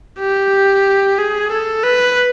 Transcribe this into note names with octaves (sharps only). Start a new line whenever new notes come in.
G4
G#4
A4
B4